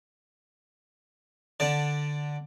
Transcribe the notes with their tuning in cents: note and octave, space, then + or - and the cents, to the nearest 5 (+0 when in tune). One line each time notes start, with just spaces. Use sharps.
D3 +0 D5 +0 A5 +15